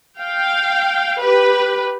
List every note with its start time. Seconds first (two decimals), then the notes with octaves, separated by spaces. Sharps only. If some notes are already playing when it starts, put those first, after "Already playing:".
0.19 F5 G5
1.20 G4 B4